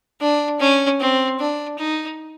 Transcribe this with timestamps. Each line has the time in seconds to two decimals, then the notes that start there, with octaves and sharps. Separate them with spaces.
0.21 D4
0.60 C#4
1.00 C4
1.39 D4
1.79 D#4